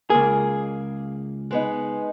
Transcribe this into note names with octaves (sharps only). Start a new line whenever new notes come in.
C#2 A#3 G#4
G#3 B3 D#4